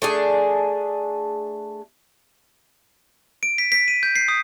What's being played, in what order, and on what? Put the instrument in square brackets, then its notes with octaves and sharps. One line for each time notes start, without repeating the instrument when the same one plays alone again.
[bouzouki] A3 D4 G#4
[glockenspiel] D7
B6
B6
D#7
G6
C7
D#6